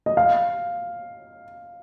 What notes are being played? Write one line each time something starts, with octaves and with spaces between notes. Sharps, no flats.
D#5
F5